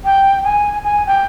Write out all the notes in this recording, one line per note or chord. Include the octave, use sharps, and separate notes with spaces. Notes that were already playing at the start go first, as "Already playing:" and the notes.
G5
G#5
G#5
G5